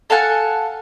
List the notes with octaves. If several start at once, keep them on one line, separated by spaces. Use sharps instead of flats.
A4 F5 F#5 G#5